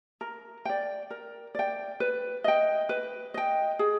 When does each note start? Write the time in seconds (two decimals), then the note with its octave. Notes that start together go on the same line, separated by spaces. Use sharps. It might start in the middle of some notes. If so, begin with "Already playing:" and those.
0.21 A#4
0.65 D5 G5
1.10 A#4
1.55 D5 G5
2.00 B4
2.44 D#5 G5
2.89 B4
3.34 D#5 G5
3.79 G#4